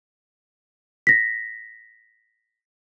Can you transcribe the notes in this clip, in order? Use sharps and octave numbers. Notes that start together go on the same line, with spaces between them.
A#6 B6